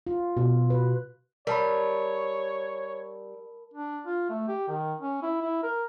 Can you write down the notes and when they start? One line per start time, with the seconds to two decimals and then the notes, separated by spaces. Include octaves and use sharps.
0.07 F4
0.37 B2
0.70 B4
1.47 G3 A#4 C#5 A5 B5
3.74 D4
4.06 F4
4.30 A3
4.48 G4
4.68 D#3
5.01 C#4
5.23 E4
5.42 E4
5.63 A#4